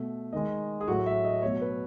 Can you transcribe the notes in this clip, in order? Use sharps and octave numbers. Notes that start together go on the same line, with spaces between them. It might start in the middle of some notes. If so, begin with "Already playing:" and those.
Already playing: B2 A3
D#3 G#3 D#5
G#4
A2 F#3 A3 F#4
E5
D#5
B2 F#3 A3 C#5
B4